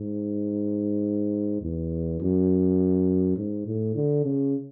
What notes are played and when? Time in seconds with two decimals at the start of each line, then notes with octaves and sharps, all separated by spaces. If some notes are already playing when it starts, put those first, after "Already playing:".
Already playing: G#2
1.62 E2
2.21 F#2
3.37 G#2
3.66 A2
3.95 D3
4.25 C#3